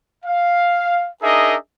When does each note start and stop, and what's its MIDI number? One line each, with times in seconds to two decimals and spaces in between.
0.25 1.08 77
1.22 1.56 62
1.22 1.56 63
1.22 1.56 68
1.22 1.56 70
1.22 1.56 75
1.22 1.56 76